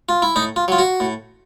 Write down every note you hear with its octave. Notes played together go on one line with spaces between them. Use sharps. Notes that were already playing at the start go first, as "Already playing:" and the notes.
F4
E4
A2 D#4
F4
F#3 F4
F#4
A2